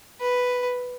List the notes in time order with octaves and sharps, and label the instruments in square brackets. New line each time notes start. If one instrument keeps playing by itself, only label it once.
[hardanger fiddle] B4